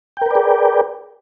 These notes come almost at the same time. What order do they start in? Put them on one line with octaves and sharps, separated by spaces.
G5 A#4 B4 D5 G#4